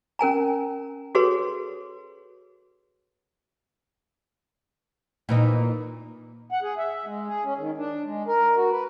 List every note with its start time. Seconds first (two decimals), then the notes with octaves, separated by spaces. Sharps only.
0.19 C#4 A#4 G#5 A#5
1.15 F#4 G#4 A4 B4 C#5 C6
5.29 A#2 E3 D#4
6.51 F#5
6.62 G#4
6.78 E5
7.05 G#3
7.28 G#4
7.44 C#4
7.58 D#3
7.78 D4
8.05 G#3
8.27 A#4
8.56 F#4
8.71 B4